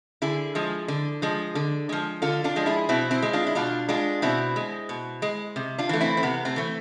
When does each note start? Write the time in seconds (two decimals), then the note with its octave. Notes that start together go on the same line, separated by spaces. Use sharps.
0.22 D3 E4 G#4
0.55 F3 G#3
0.88 D3
1.22 F3 G#3
1.55 D3
1.89 F3 G#3
2.22 D3 F4 A4
2.44 D4 F4
2.56 F3 G#3
2.66 E4 G#4
2.89 B2 C4 E4
3.11 C4 E4
3.22 G#3
3.33 D4 F4
3.47 E4
3.55 B2 D4 F4
3.89 G#3 D4 F4
4.22 B2 C4 E4
4.56 G#3
4.89 B2
5.22 G#3
5.56 C3
5.78 D4 F4
5.89 E3 A3
6.01 C4 E4
6.17 C4
6.23 C3 B3
6.45 A3 C4
6.56 E3 A3